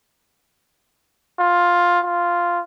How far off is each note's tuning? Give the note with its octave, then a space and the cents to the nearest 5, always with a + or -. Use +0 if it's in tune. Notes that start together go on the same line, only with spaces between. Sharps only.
F4 +10
F4 -5